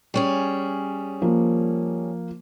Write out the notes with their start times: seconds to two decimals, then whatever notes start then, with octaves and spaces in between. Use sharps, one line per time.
0.14 G3 C#4 G#4
1.22 F3 A#3